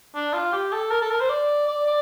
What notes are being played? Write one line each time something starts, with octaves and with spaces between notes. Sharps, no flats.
D4
F4
G4
A4
A#4
A4
A#4
C5
D5
D5
D5